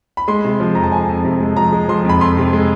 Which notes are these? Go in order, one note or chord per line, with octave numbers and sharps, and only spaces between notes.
B5
G#3 C6
C3
F3
F2 A#5
A5
F3 G#5
F2
C3
G#3
F3 A#5
G#3
F3 C6
F2 B5
F2 C6
C3
G#3